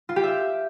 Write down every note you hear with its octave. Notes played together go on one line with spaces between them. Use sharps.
F4
G4
E5